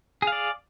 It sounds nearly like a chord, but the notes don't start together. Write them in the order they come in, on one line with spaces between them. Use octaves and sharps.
G#4 F5 D5